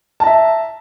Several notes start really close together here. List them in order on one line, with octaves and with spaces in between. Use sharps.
A5 A#5 E5